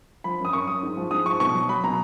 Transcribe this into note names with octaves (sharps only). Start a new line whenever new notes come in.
F3 B5
F#2 D#6
F#2 C#6
F#2 D#6
G#2
F3
G#2 D#6
F3 C#6
B2 C#6
F#3
F#3 B5
B2 A#5